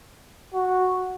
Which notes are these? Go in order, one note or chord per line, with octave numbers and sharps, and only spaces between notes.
F#4